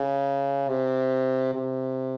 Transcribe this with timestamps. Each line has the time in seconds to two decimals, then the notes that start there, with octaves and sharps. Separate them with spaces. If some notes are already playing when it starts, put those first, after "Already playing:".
Already playing: C#3
0.69 C3
1.54 C3